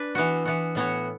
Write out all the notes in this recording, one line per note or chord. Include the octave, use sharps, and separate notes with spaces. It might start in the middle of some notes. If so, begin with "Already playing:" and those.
Already playing: D4 B4
E3 B3 F#4
E3 B3 F#4
A2 E3 B3 F#4 C#5